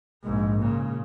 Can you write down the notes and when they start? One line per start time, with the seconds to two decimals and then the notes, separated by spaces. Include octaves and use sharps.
0.24 A#1 G#2
0.61 A#2 C#3